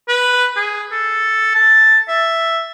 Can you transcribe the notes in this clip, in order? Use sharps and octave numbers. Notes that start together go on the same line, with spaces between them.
B4
G#4
A4
A5
E5